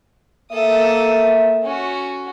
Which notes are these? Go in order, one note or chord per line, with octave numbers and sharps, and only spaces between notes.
A#3 A4 E5 D#6
C#4 F#4